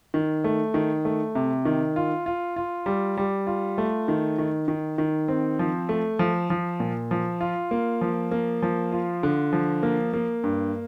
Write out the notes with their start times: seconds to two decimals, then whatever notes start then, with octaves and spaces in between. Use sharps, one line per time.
0.14 D#3
0.44 A3
0.74 D#3
1.05 A3
1.35 C3
1.65 D#3
1.96 F4
2.26 F4
2.56 F4
2.86 G3
3.17 G3
3.47 F4
3.78 A3
4.08 D#3
4.38 D#3
4.68 D#3
4.98 D#3
5.28 C4
5.59 F3
5.89 A3
6.19 F3
6.50 F3
6.80 A#2
7.11 F3
7.41 F4
7.71 A#3
8.01 F3
8.31 A#3
8.62 F3
8.92 F4
9.23 D3
9.53 F3
9.83 A#3
10.13 A#3
10.44 G2